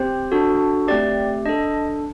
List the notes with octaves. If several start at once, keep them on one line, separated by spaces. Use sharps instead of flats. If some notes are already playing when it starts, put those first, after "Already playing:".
Already playing: C4 G4 C5
D4 F#4 A4
A3 C4 G4 D5
D4 A4 D#5